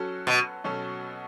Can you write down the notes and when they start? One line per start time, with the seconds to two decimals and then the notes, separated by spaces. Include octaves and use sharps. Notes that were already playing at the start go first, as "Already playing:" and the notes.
Already playing: F#3 C#4 F#4 A4
0.27 B2
0.64 B2 F#3 C#4 A4